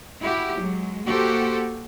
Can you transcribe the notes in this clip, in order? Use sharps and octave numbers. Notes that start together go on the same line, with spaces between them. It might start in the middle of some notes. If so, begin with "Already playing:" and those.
E4 F#4 G4
F#3 G#3
A#3 F#4 G4 A4 C5